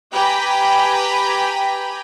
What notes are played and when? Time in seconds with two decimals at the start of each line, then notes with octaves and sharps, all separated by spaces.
0.13 G4 B4 G5 G#5 A#5 B5